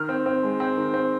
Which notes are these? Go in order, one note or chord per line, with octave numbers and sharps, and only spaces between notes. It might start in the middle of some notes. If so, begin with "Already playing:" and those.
Already playing: D#3 F6
C4
C4
G#3
C4
D#3
C4